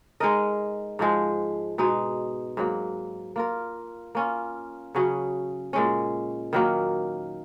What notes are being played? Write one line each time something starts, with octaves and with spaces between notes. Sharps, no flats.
G#3 D#4 A#4 D#5
G#2 F3 G#3
B2 G#3 D#4
G#2 F#3 A#3
A#3 F4 A#4
A#3 C#4 F4
C#3 F#3 C#4 G#4
A#2 G#3 C#4
D#3 F#3 A#3